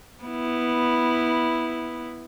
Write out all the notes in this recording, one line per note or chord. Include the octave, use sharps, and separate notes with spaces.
B3 E4